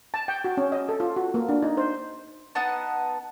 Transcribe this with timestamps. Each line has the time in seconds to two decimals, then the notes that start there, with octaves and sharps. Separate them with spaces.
0.14 A5
0.28 G5
0.44 F#4
0.57 C#4
0.72 D#5
0.89 A4
1.00 F4
1.16 F#4
1.34 A#3
1.49 D4
1.63 D#4
1.77 C5
2.55 B3 D#4 F#5 A5